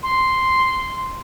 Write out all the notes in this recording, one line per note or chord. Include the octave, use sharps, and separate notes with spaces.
C6